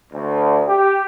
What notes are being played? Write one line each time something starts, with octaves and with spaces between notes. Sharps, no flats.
D2
G4